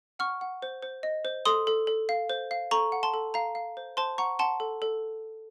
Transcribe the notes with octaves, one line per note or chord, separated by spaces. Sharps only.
F#5 C#6 F6
F#5
C5
C5
D#5
C5
A4 C6 D#6
A4
A4
F5
C5
F5
A4 A#5 C#6
F#5
A5 C6
A4
F5 A#5
F5
C5
C5 A5 C6
F#5 A#5 C#6
F#5 A5 C6
A4
A4